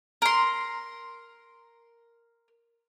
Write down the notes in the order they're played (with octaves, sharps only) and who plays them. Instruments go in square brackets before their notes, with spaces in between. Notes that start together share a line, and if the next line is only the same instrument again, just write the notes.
[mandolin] A#4 C6